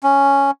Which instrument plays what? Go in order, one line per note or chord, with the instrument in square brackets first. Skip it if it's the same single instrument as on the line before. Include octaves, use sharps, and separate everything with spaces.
[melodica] C#4